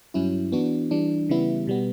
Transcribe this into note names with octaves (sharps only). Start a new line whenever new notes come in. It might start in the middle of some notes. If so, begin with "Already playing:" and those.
G2 F#3 C#4 E4
E3 B3 D4 F#4
E3 G3 D4
C#3 E3 G3 B3 E4
B2 G3 B3